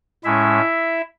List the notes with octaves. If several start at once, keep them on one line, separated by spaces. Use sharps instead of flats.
A2 G#3 C#4 E4 E5